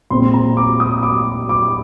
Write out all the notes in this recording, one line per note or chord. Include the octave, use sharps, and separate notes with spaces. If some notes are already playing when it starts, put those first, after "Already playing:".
A#2 G#3 C4 C6
A#5
D6
D#6
D6
D6